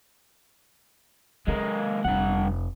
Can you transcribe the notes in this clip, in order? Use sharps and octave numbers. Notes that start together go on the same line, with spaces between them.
C#3 G#3 A#3
F1 G2 F#5